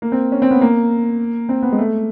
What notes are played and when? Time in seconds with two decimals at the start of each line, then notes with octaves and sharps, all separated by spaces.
0.02 A#3
0.12 C4
0.32 C#4
0.42 C4
0.51 B3
0.61 A#3
1.49 C4
1.63 B3
1.72 G#3
1.78 A3